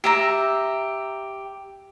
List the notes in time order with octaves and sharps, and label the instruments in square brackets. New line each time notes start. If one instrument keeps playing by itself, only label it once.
[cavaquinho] G4 E5 A#5